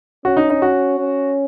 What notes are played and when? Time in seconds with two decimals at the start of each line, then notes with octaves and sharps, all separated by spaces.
0.25 C#4 F#4
0.37 D#4
0.50 D#4
0.62 F#4
0.98 C#4